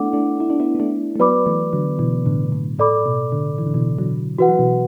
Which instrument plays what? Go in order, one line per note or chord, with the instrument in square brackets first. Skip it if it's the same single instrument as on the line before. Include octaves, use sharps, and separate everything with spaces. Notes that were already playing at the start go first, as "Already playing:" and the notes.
Already playing: [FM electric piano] A3 B3 D4 E4 [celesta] A4 F#5 D6
[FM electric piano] A3 D4
E4
D4
B3 E4
B3
A3 D4
A3
[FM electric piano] F#3 B3 [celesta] B4 D5 B5 D6
[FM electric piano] E3 A3
D3 F#3
B2 E3
A2 D3
A2
[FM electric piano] A2 [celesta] A4 D5 B5 D6
[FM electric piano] B2
A2 D3
E3
D3
B2 E3
D3 F#3
[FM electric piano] E3 [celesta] F#4 B4 F#5
[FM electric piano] F#3
B2 E3